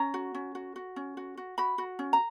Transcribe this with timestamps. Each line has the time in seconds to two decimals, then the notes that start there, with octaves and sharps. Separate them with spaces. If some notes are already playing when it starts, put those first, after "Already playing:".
Already playing: C#4 A#5
0.14 F#4
0.35 C#4
0.55 F#4
0.76 F#4
0.96 C#4
1.17 F#4
1.37 F#4
1.58 F#4 B5
1.78 F#4
1.99 C#4
2.13 A#5